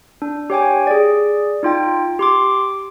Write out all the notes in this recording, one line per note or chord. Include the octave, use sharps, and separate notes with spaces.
D4
G4 C#5 G5 G#5
G#4 D5
D#4 F4 G5
G4 C6 D6